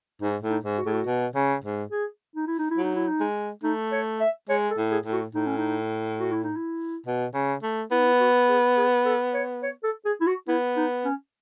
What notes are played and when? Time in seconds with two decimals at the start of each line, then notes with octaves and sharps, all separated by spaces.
0.21 G#2 D#4
0.42 A2
0.50 D#4
0.64 G#2
0.78 F#4
0.86 A2 G#4
0.93 F#4
1.07 B2
1.35 C#3
1.64 G#2
1.92 G#4
2.36 D#4
2.47 E4
2.59 D#4
2.71 E4
2.78 F#3
2.84 D#4
2.96 E4
3.08 D#4
3.20 G#3
3.64 A3 D#4
3.92 C#5
4.21 E5
4.49 G#3 C#5
4.71 A4
4.78 A2
4.92 G#4
5.06 A2
5.13 F#4
5.35 A2 D#4
5.47 C#4
5.58 D#4
6.20 F#4
6.32 E4
6.44 D#4
6.56 E4
7.06 B2
7.34 C#3
7.63 A3
7.91 B3 E4
7.99 D#4
8.05 E4
8.20 F#4
8.49 G#4
8.77 G#4
9.06 A4
9.34 C#5
9.63 C#5
9.84 A4
10.06 G#4
10.21 E4
10.27 F#4
10.48 B3 E4
10.77 D#4
11.05 C#4